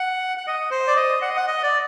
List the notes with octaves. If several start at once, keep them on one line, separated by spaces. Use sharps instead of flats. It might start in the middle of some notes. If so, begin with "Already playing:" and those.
Already playing: F#5
F#5
D#5
C5
D5
D#5
F#5
D#5
F#5
D#5
D5